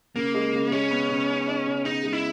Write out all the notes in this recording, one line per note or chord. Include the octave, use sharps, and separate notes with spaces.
C#3 A#3
G#3
C#3
G#3 C#4
B3
C#3
D#4
D#4
C#3
C#3 D#4
G#3
E4